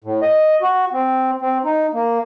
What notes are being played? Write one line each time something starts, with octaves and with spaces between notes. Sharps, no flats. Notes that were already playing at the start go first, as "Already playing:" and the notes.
A2
D#5
F#4
C4
C4
D#4
A#3